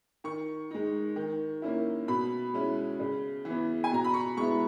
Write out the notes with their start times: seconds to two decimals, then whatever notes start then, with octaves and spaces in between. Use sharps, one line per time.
0.24 D#3 C#6
0.71 G#3 D#4
1.16 D#3
1.62 A#3 C#4 E4
2.08 B2 B5
2.54 G#3 C#4 E4
3.00 C#3
3.45 E3
3.50 B3
3.84 G#5
3.92 B2 A#5
4.04 B5
4.14 C#6
4.37 G#3 B3 E4 C#6